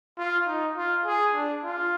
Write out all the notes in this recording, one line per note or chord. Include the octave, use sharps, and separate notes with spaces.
F4
D#4
F4
G#4
D4
F4